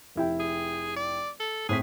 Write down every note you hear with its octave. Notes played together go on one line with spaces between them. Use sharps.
F1 E4 G5
G#4
D5
A4
A2 C4 G#4 B6